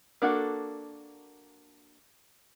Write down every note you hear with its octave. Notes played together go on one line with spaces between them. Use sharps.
A#3 D4 F#4 A4